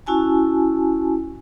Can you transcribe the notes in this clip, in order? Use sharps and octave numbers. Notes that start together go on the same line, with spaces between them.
C#4 E4 F#4 G#5 A5